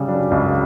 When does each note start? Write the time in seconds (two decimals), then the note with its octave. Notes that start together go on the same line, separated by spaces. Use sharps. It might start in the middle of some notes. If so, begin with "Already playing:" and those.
Already playing: C#3 G3
0.08 F#2 D4
0.31 C#2